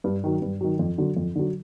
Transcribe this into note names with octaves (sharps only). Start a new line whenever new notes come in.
G2
D#3 F#3
G2
D#3 F#3
F2
D3 F#3
F2
D3 F#3